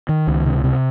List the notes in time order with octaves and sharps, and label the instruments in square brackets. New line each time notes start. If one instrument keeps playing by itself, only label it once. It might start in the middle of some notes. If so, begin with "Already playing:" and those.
[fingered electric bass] D#3
C#2
C3
C3